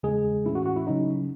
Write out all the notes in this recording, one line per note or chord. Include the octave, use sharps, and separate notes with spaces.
E2 C#3 G#3 G#4
A2 E3 A3 C#4 E4
F#4
F#4
E4
C#3 F#3 C#4 D#4